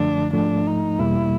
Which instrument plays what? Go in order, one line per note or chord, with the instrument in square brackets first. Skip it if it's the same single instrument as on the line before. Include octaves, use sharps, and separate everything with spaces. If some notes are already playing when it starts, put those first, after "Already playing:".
Already playing: [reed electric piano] F#2 D3 F3 A3 [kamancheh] D4
[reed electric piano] G#2 F3 A3 [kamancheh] D4
[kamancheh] D#4
[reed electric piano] E2 B2 G3 A#3 [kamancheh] E4